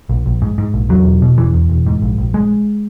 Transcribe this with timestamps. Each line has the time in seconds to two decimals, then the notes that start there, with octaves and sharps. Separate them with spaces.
0.09 A#1
0.26 A#1
0.42 G#2
0.58 G#2
0.74 A#1
0.89 E2 F#3
1.05 E1
1.22 B2
1.38 E1 E3
1.54 E2
1.69 E1
1.86 G#2
2.02 A#1
2.18 A#1
2.34 G#3